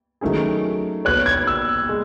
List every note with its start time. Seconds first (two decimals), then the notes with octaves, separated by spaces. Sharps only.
0.21 D#3 F#3 A3 C#4 G#4
1.05 B3 F#4 C#5 F#6
1.26 G#6
1.47 E6
1.89 G#3